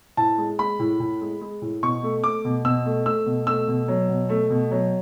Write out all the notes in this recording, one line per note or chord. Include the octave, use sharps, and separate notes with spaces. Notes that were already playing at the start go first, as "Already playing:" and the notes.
A2 A5
G#3
G#3 B5
A2
A2
G#3
G#3
A2
B2 C#6
A3
A3 D6
B2
B2 E6
A3
A3 E6
B2
A3 E6
B2
F#3
B2
A3
B2
F#3